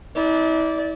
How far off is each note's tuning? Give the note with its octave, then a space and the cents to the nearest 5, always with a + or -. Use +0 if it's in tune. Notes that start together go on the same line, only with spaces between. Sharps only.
E4 -40 D5 -15